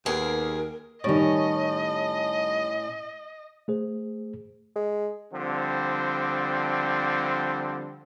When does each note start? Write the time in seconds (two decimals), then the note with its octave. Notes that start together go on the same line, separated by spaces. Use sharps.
0.06 D#2 B3 G#4 A#4
1.04 A2 D#3 G3 C#4 C#5 D#5
3.68 A3 G#4 C5
4.75 G#3
5.34 D3 F3 G3 C4